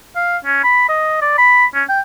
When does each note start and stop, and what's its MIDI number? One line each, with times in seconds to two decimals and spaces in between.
0.16 0.37 77
0.45 0.60 61
0.64 0.88 83
0.89 1.18 75
1.22 1.36 74
1.38 1.66 83
1.74 1.84 61
1.89 2.01 79